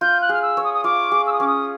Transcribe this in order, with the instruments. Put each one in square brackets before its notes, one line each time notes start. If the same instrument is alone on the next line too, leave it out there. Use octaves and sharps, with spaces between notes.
[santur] F4 [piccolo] G6
[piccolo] F#6
[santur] G#4 [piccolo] F6
[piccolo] E6
[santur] C#5
[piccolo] D#6
D#6
[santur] F4 [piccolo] D6
[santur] G#4
[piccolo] E6
D#6
[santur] C#4 [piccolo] D6
[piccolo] D#6